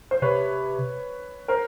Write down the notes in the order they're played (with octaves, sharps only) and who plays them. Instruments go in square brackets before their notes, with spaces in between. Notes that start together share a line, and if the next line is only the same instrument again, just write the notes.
[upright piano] C5
[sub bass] C3 [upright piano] B4 C#5
[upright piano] A#4 C5